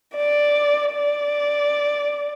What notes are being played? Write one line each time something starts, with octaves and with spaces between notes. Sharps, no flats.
D5
D5